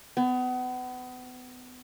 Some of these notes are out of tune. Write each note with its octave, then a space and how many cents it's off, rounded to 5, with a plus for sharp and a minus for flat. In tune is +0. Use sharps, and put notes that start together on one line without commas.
B3 +30